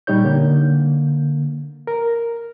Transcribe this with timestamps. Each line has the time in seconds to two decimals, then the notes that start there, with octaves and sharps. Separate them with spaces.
0.07 A#2 G3 D#4 G4 C#5 G6
0.24 D3 A#3
1.87 A#4